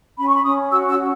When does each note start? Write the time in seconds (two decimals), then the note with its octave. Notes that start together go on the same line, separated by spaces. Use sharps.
0.18 C#4 B5
0.27 C#6
0.35 B5
0.44 C#4 D#6
0.71 F#4 E6
0.88 E6
0.97 F#4